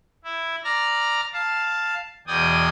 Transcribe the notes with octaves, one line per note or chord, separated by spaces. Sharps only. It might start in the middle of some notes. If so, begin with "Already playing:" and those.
E4
D5 A#5 F6
F5 A5
E2 B2 D5 G5 G#5 D#6